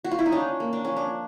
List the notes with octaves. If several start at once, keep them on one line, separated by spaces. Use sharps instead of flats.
F#4
F4
E4
D#4
C#4 D4
A#3
D4
F3 C#4
D4